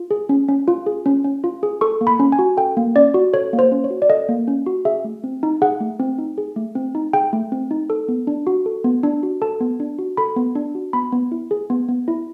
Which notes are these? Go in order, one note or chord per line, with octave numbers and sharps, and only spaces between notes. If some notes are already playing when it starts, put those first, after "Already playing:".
Already playing: F4
G#4
C#4
C#4
F4
G#4
C#4
C#4
F4
G#4
A4 C#6
A#3
B5
C#4
G#5
F#4
A4 G5
A#3
C#4 D5
F#4
A4 C#5
A#3
C5
C#4
C#5
F#4
D5
A4 D#5
A#3
C#4
F#4
G#4 E5
A3
C4
D#4
G#4 F#5
A3
C4
D#4
G#4
A3
C4
D#4
G#4 G5
A3
C4
D#4
A4
B3
D4
F#4
A4
B3
D4
F#4
A4 A5
B3
D4
F#4
A4 B5
B3
D4
F#4
B3 B5
B3
E4
G#4
B3
B3
E4